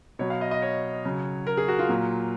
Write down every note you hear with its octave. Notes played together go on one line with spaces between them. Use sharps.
B2 F#3 C#5
F5
D#5
D#5
C#5
C#3 F#3
A#4
G#4
F#4
F4
A#2 F#3